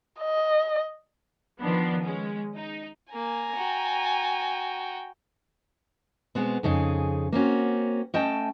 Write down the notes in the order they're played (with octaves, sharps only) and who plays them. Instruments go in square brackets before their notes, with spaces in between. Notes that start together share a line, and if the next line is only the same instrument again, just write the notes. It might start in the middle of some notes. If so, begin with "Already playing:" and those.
[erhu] D#5
[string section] D#3 F3 B3 D4
G#3 C#4
D#4
[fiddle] A#3 [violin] G#5 A#5
[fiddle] F#4 G5
[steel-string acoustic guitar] B2 G#3 B3 C4
F2 C#3 D#4 G4 G#4
A#3 C4 C#4 F#4
A3 C#4 D#5 G5 A5